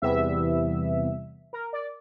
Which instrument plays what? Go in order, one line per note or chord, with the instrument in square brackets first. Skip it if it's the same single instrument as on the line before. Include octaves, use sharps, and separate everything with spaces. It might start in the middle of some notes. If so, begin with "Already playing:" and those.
[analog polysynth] E2 C3 E3 G3 B3 E5
A#4
D5